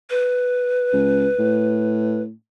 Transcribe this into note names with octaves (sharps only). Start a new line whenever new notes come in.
B4
C#2
A2